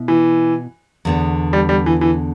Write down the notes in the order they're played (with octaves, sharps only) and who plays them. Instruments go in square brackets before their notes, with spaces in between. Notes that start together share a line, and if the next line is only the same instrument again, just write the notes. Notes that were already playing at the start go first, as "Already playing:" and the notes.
Already playing: [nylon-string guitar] B2 E4
[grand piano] E3
[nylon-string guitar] E2 D3 B3
[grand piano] G3
G3
E3
E3